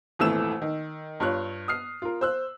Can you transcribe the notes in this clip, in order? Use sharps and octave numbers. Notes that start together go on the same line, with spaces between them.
D#1 G#1 E3 A3 E6 E7
D#3
G2 F4 C#5 F#6
D#6 F6 C7
F4 A#4
C5 E6 F#6